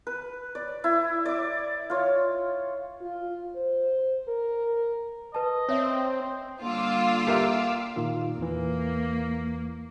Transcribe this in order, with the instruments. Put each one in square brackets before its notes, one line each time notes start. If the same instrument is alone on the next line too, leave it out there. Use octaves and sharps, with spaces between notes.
[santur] B4
D5
E4
D5 D6
F4 C#5
[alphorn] F4
C5
A#4
[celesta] B4 A5 [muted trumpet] D#5
[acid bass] C4 [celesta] C#5 E5
[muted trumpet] C5
[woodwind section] D3 G3 A#3 [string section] F4 [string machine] F5 D6 E6
[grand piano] G4 A#4 E5
[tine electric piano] A#2 D#3 F4
[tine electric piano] E2 E3 [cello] A#3